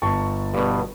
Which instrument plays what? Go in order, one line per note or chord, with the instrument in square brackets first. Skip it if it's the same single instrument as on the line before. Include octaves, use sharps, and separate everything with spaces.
[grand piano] G1 A5 C#6
[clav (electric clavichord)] G2 B2